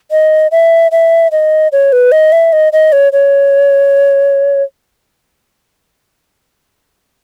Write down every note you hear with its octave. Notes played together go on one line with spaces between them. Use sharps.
D#5
E5
E5
D#5
C#5
B4
D#5
E5
D#5
D#5
C#5
C#5